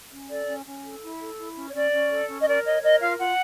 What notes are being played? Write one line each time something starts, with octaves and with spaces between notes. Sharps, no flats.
C#4
A4 D5
C#4
C#4
A4
E4
A4
E4
C#4
C#5
C#4 D5
C#4
A4
C#4
D#5
A#4 D5
C#5 D#5
A#4 D#5
F4 F5
F4 F#5